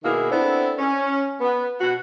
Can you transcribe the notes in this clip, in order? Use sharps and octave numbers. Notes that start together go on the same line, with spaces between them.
B2 D#3 A#3 E4 G#4
B3 C4 D4 E4 A4
C#4
B3
B2 F#4 F#5